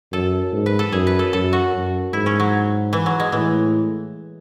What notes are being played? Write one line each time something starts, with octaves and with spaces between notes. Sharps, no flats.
F#2 A4
G#2
B4
A4
F#2 G#4
B4
A4
F#2 A4
F#4
F#2
G#2 E4
C#4
F#3
E3
F#3
G#3
A2 E3